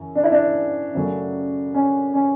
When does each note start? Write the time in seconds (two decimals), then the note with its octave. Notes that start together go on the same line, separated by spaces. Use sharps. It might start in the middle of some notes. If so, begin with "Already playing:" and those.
Already playing: F#2 C#3 E3
0.16 D4
0.24 E4
0.32 D4
0.95 F#2 C#3 F#3 A3
1.74 C#4
2.14 C#4